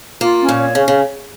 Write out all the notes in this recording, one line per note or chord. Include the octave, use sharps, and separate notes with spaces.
A#3 F4
C#4
A#2
C#5
C#3 C#4
C#3